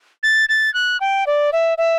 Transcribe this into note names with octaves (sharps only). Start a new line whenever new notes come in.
A6
A6
F#6
G5
D5
E5
E5